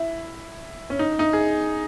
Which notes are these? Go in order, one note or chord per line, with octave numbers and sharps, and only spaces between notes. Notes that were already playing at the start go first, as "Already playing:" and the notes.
Already playing: E4
C#4
D#4
D#4
G#4